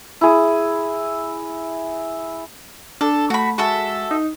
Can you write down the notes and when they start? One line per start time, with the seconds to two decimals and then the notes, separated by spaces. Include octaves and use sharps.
0.21 E4 G#4
3.01 D4 A4
3.30 A3 F#4 B5
3.58 G#3 F#4 A4 E5
4.11 D#4